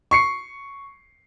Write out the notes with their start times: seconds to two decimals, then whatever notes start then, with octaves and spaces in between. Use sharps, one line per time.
0.11 C#6 C7 C#7